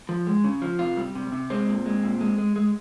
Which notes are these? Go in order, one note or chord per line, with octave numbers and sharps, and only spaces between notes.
F3
G#3
C#3
F3
C3 F4
G3
C3
C3
G#3 C4
A#2
G#3
A#2
G#3
G#3
G#3